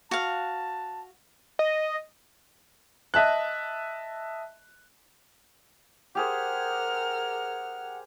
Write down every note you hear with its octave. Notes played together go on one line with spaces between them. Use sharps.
F#4 F5 A5
D#5
D#5 E5 A5 F#6
G4 G#4 A#4 C5 F#5 F6